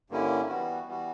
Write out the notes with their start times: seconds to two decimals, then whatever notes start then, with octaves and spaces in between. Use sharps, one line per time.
0.10 G2 D3 A#3 C#4 E4
0.49 E3 G3 B3 F#4
0.88 E3 G3 B3 F#4